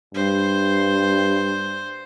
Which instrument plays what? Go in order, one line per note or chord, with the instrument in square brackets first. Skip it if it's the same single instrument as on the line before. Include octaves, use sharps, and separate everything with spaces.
[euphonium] G2 [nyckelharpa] C5